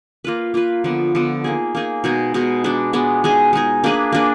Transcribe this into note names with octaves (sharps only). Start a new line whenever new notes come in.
A#3 F4 B4
A#3 F4 B4
D3 F3 B3
D3 F3 B3
A#3 D#4 G#4
A#3 D#4 G#4
B2 G#3 D#4 G#4
B2 G#3 D#4 G#4
G#3 B3 D4
G#3 B3 D4
G#3 D#4 G#4
G#3 D#4 G#4
A#3 D4 G#4 B4
A#3 D4 G#4 B4